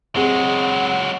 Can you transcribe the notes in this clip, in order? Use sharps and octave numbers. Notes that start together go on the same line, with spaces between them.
F#3 G#3 C4 G#4 F#5